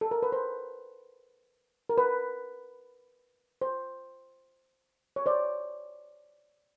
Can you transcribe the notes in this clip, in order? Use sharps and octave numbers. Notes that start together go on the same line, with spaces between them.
A4
A#4
B4
C5
A#4
B4
C5
C#5
C5 D5